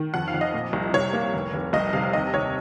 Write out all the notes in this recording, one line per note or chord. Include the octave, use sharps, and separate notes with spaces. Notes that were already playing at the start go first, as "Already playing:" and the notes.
Already playing: D#3
F2 F#5
F5
F2
D#5
A#2
C2
C3 C#5
A#3
F1
F1
C2 D#5
C3 F5
D#2 D#5
D#2 C#5